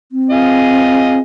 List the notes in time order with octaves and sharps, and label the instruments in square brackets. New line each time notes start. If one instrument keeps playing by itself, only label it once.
[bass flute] C4
[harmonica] F4 G#4 D#5